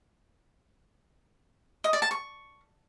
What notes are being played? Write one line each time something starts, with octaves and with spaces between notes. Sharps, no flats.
D#5
D5
A5
C#6